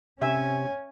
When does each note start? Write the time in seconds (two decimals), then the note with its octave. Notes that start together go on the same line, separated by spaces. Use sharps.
0.22 C3 C#4 E5 G#5